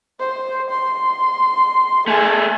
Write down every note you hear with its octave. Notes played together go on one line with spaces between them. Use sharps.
C5
C6
A3 G#4 A4